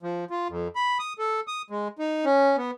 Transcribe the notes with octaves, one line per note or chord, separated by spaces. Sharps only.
F3
F4
F2
B5
D#6
A4
D#6
G#3
D#4
C#4
B3